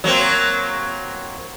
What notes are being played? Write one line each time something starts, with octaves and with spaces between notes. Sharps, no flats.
F#3 A#3 C4